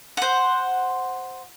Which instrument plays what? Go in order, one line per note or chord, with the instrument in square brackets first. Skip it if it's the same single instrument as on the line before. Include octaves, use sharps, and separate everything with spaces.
[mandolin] C5 F#5